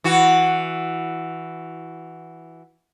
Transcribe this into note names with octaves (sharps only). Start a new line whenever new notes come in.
E3 F#4